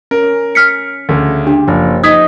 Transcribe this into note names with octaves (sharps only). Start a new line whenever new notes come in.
C#4 A#4
F6 B6 C#7
D2 C#3
D4 G4
F#1 F3
D#4 D#5 D#6 G#6 B6